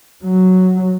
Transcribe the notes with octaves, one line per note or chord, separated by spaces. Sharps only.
F#3